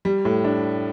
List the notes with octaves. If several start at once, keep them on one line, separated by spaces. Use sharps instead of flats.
G3
A2
D4